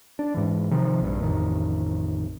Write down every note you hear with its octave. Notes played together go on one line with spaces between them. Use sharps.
D4
G#2 E3
C3 D#3 F3
A#1 G2
A1 F2 D#3